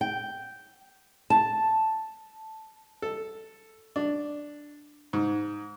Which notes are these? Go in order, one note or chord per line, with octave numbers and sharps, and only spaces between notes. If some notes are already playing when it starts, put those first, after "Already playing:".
G5
A5
A4
D4
G#2